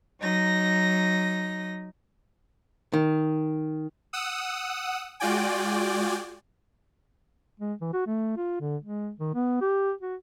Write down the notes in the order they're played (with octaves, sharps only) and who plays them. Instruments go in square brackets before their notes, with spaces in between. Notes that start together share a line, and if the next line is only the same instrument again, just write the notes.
[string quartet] F#3 D#4 A#6
[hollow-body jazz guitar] D#3
[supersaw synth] F#5 D#6 E6
G#3 F4 F#4 D5 G5 G#5
[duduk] G#3
E3
F#4
A3
F4
D3
G#3
D#3
B3
G4
F#4